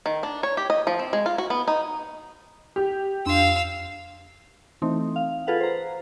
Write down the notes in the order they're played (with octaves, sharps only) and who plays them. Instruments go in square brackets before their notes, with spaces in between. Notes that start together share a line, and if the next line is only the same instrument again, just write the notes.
[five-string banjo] D#3
D4
C#5
G4
D#5
F3
C4
G#3
F4
F#4
B3
D#4
[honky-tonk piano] G4
[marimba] F2 D4 C6 [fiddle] F5 E6
[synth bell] E3 A3 C4 D#4
F5
F4 G#4 A4 B4 F5 F#5
C5 A#5